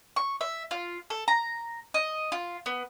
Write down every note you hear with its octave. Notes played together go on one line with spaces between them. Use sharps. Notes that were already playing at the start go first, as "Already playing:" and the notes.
C#6
E5
F4
A4
A#5
D#5
F4
B3